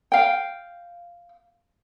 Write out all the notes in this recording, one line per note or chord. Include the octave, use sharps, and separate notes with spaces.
F5 G5